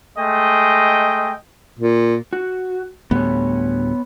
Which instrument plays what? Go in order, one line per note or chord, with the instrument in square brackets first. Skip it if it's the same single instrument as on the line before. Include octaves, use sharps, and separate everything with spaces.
[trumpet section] G#3 A3 D#5 G5
[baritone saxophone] A#2
[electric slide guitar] F#4
[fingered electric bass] D2 A2 G3 [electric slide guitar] B3 C#5